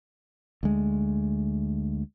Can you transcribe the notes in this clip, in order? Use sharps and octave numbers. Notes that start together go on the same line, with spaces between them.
D2 G#3